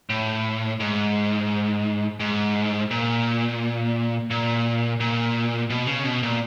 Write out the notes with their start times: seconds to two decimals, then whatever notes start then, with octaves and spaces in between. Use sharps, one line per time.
0.10 A2
0.80 G#2
2.20 G#2
2.91 A#2
4.31 A#2
5.00 A#2
5.70 B2
5.87 C#3
6.04 B2
6.23 A#2